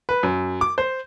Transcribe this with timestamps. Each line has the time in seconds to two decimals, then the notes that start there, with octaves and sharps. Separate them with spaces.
0.09 B4
0.23 F#2
0.61 D6
0.78 C5